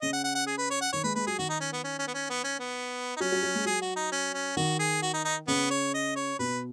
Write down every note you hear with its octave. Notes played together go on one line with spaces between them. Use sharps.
C#3 D#5
F#5
F#5
F#5
G#4
B4
C#5
F#5
D#3 C#5
G#3 B4
G#3 B4
F#3 G#4
D#3 F#4
D#4
C#4
B3
C#4
C#4
B3
C#4
B3
C#4
B3
D#4
F#3 C#4
F#3
F#3
G#3
F#3 G#4
F#4
D#4
C#4
C#4
D#3 F#4
G#4
F#4
D#4
D#4
C#3 B3
C#5
D#5
C#5
B2 B4